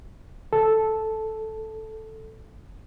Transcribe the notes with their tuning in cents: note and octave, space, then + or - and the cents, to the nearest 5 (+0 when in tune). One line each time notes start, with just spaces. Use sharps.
A4 -5